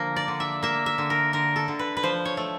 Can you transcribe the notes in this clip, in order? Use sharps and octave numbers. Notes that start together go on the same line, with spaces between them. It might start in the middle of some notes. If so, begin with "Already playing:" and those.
Already playing: D3 F3 A#3
D5
D3
E5
A#3 E5
E5
D3
A#4
D3 A#4
A4
D3
B4
B4
F3 C5
C#5
A3